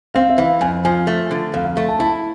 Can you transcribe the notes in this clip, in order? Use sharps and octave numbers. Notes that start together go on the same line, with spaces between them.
C4 F5
E5
E3 F5
F2 G#5
F3 G#5
A3
D3
F2 F5
F5
A3
A5
E4 A5